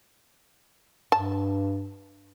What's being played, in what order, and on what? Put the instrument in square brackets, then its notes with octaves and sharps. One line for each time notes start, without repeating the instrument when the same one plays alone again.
[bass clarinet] G2 [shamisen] A5